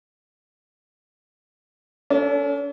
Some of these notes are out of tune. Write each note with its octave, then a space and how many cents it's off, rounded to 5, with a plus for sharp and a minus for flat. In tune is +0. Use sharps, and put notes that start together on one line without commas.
C#4 +45 A4 +15